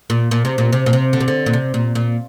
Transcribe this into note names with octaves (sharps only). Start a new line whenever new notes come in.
A#2
A#2
C3
A#2
C3
A#2
C3
D3
C3
D3
A#2
C3
A#2
A#2